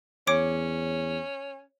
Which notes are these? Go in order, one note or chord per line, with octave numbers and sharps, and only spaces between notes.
E2 C#4 C#5 D6 D7